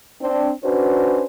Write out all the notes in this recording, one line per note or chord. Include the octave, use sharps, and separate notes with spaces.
C4 D4
C#4 D4 F#4 B4 C5